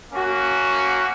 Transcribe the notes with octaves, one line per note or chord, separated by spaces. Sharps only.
A#3 C#4 F#4